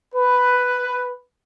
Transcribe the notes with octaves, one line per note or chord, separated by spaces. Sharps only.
B4